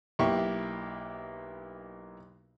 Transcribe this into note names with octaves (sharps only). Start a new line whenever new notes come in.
B1 A#3 B3 E4 G4 C#6